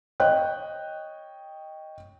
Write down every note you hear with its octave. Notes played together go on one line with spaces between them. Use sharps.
C#5 D#5 G5 F#6